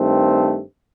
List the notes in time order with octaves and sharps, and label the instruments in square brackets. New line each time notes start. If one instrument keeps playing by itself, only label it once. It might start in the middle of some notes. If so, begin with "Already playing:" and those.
Already playing: [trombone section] G2 D#3 A3 C4